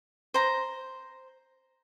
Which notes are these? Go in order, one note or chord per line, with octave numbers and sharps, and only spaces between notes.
C5 A#5